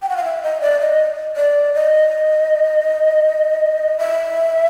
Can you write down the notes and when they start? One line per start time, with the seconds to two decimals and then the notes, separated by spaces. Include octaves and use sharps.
0.02 G5
0.09 F#5
0.16 F5
0.25 E5
0.43 D#5
0.61 D5
0.80 D#5
1.37 D5
1.74 D#5
3.98 E5